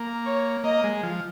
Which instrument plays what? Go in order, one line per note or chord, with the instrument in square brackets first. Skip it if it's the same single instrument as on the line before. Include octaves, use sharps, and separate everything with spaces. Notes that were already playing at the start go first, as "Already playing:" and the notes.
Already playing: [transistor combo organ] A#3
[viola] C#5
[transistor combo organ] A#3 [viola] D#5
[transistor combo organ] G#3
F3